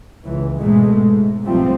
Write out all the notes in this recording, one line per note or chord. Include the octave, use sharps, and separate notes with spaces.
C#2 E3
G#2 B2 G#3 A3
G#2
B1 G#2 F3 G3 A3 C4